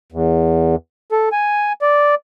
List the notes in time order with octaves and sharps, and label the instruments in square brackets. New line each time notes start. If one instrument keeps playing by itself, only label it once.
[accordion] E2
A4
G#5
D5